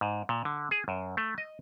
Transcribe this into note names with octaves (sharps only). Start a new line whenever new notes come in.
G#2
A#2
D3
G#4
F#2
A3
D#5